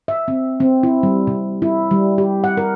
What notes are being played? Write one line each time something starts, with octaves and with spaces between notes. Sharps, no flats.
E5
C4
C4
E4
G3
C3
E4
G3
G4
F#5
A#4